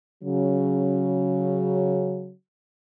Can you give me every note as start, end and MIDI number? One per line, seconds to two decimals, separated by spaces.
0.23 2.31 49
0.23 2.31 54